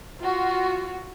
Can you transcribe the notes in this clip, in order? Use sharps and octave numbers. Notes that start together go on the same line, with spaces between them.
F4 F#4